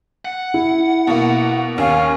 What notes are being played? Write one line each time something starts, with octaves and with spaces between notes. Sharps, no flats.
F#5
E4
B2 A#3
D#2 C#4 F5